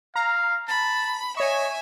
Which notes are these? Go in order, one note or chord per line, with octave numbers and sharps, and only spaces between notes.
F5 A#5
A5 B5
C#5 D#5 E5 G#5 C#6